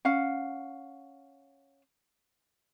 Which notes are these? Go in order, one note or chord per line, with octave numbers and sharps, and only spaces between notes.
C#4 F5 F#5